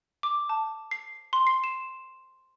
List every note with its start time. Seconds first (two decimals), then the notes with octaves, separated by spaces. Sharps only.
0.23 D6
0.49 A5
0.91 C7
1.33 C6
1.47 C7
1.64 E7